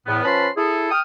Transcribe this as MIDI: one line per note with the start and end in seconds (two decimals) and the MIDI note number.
0.06 0.23 40
0.06 0.23 45
0.06 0.23 59
0.24 0.48 53
0.24 0.48 61
0.24 0.48 71
0.24 0.48 81
0.24 0.48 83
0.24 0.48 84
0.56 0.89 64
0.56 0.89 68
0.56 0.89 69
0.91 1.00 79
0.91 1.00 87
0.91 1.00 89